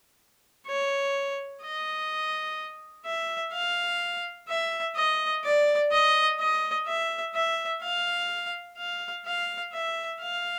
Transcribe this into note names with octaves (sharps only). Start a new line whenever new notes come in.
C#5
D#5
E5
F5
E5
D#5
D5
D#5
D#5
E5
E5
F5
F5
F5
E5
F5